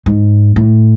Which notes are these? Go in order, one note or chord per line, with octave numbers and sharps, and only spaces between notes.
G#2
A2